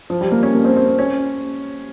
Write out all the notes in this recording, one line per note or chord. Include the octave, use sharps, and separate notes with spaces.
F3
G3
A#3
C#4
A#3
C4
C4
C4
C#4